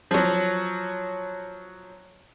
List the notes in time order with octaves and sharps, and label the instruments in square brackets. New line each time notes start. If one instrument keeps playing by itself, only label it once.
[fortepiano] F3 F#3